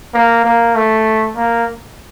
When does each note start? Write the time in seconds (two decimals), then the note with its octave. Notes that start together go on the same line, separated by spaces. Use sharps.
0.14 A#3
0.45 A#3
0.75 A3
1.37 A#3